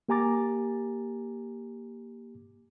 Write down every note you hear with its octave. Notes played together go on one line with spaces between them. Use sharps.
A#3 G4 G#5 A#5 D6 A6